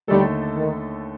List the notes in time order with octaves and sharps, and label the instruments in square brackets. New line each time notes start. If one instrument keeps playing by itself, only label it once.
[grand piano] D#2 D3 A3 D#4 A4 [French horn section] G3
[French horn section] D#3